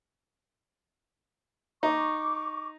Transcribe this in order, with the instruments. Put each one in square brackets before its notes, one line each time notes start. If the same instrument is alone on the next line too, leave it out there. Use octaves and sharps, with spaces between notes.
[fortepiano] D#4 [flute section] C#6 D6